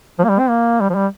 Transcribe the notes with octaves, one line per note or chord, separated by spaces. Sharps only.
F3
A#3
G3
C4
A#3
G3
F3
G3